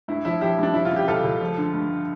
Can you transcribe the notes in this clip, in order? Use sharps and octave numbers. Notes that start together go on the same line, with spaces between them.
G2 E4
F3 E4
F3 E4 G4
G2 D4
F3 E4
F4
C#3
G4
C#2 F4 A4
C#2
F3
D3
G2